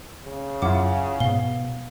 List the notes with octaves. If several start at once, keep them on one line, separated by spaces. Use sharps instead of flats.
C#3
F#2 E4 F4 F#5 D6
G#2 B2 F5 G7